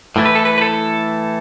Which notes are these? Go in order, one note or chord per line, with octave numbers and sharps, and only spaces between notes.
A2 E3 A3
B4
A4
B4
B4
A4